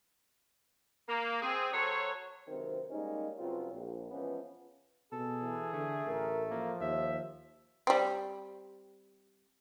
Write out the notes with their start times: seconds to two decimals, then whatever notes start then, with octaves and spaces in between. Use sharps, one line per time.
1.08 A#3
1.42 C4 G#4
1.73 F#3 A4 C5 C#5
2.48 C#2 F#2 C3 D#3 C4 C5
2.90 G3 G#3 A#3 C#4 D#4
3.39 G2 C#3 F#3 C4 F4
3.72 A#1
4.11 E3 F3 G#3 B3 C#4
5.12 B2 G#4 A4
5.41 E3
5.74 D3 A3
6.06 A1 A#4
6.50 F3 A#3
6.81 D#2 E5
7.87 G3 C4